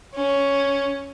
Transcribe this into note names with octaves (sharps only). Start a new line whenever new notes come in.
C#4